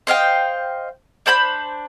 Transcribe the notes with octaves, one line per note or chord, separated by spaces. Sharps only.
C5 D#5 F5 G5
D4 C5 B5 G6